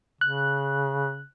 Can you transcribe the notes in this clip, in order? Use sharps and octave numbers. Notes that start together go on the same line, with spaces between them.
C#3 F#6